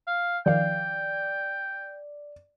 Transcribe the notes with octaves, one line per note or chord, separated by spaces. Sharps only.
F5
D#3 F3 D5 F5 G5